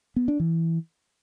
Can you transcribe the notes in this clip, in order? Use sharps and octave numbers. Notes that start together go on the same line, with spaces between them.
B3
D4
E3